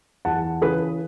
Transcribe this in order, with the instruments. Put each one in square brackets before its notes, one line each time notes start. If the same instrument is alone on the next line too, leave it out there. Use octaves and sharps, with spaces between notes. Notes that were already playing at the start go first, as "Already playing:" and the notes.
[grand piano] E2 F#5 A5
C#3 E3 G#4 B4